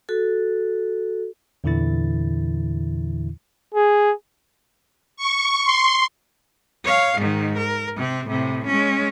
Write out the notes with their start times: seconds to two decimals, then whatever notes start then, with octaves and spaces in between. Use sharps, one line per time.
0.09 F#4 A4
1.64 E2 A#2 D3 E3 E4 A6
3.74 G#4
5.17 C#6
5.64 C6
6.85 C#5 F5
7.19 G#2 D#3
7.58 A#4
7.97 C3 C4
8.28 A2 C3
8.67 G#3 C#4